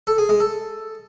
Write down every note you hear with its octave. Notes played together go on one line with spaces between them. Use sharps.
A4
G#4
G#3
A4